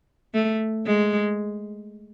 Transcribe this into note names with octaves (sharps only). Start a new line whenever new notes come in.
A3
G#3